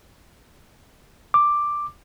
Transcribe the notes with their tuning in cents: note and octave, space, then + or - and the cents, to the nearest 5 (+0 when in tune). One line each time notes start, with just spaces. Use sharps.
D6 +5